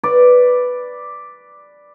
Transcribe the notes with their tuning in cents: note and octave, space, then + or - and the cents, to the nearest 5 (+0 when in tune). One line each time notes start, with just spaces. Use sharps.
B4 +0 D5 +0